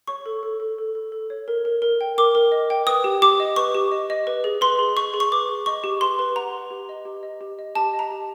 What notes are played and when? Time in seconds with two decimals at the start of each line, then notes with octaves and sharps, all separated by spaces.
0.07 C#5 C#6
0.26 A4
0.43 A4
0.60 A4
0.78 A4
0.95 A4
1.12 A4
1.30 C#5
1.48 A#4
1.65 A#4
1.82 A#4
2.01 G5
2.18 A#4 D6
2.35 A#4
2.52 D#5
2.70 G5
2.87 B4 D#6
3.04 G4
3.22 G4 D6
3.40 D#5
3.56 B4 C#6
3.74 G4
3.92 D#5
4.10 D#5
4.27 B4
4.44 G#4
4.61 B4 C6
4.79 G#4
4.96 G#4 C#6
5.14 G#4
5.20 C#6
5.32 B4 D6
5.49 G#4
5.66 D#5 C#6
5.84 G4
6.01 B4 C6
6.19 B4
6.36 F#5 A#5
6.54 B4
6.71 G4
6.89 D#5
7.05 G4
7.23 D#5
7.41 G4
7.59 D#5
7.75 G4 A5
7.93 D#5
7.99 A#5
8.11 G4